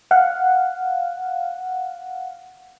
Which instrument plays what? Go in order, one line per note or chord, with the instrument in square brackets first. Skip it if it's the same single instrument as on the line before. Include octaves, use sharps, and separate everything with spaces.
[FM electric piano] F5 F#5